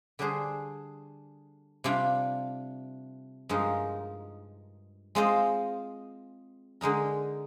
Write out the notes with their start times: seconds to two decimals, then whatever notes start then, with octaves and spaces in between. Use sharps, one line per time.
0.19 D3 G3 D4 G#4 C5
1.84 C3 G3 D4 F4
3.49 G2 F3 G#3 D#4 A#4
5.15 G#3 C4 F4 C5 D#5
6.81 D3 G#3 D#4 A#4